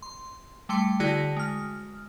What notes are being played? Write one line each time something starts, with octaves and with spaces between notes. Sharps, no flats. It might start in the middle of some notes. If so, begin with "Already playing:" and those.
C6
G3 A3 G5 C6 C#7
D3 E4 F#4 G#4 G5 A#6
G#3 F6